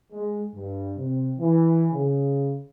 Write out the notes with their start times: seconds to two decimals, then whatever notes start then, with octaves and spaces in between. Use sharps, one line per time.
0.12 G#3
0.54 G2
0.97 C3
1.37 E3
1.92 C#3